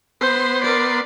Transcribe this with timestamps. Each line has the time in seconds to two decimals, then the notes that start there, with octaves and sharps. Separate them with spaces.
0.21 B3 C5 C6
0.64 A#4 D5